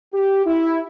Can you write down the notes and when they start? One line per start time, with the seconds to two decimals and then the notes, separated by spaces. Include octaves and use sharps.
0.13 G4
0.46 E4